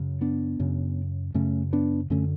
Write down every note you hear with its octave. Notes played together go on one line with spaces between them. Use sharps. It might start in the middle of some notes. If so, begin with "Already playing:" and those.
Already playing: F#2 C#3
B3 D4
F#2 C#3
F#2 C#3 A3 C#4
B3 D4
F#2 D3 A3 C#4